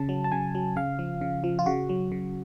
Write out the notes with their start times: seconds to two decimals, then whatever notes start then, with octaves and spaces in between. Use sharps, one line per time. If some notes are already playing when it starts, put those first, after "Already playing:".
Already playing: C#3 A5
0.09 F#3
0.24 A5
0.32 C#3 G#5
0.55 F#3
0.76 C#3 F5
0.99 F3
1.21 C#3
1.44 F3
1.59 F4
1.66 C#3 F#4
1.89 F#3
2.12 C#3